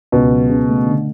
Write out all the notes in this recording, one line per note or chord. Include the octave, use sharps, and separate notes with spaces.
C#2 B2
F#3
C#3
A3
D3